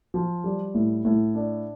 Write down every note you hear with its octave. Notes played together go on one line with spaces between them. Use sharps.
F3
G3
A2
A2
D4